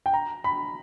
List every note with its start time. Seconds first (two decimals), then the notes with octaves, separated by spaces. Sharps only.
0.06 G5
0.14 A#5
0.44 B5